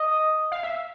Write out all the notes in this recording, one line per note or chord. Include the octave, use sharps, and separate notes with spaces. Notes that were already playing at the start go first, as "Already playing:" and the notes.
Already playing: D#5
F5
E5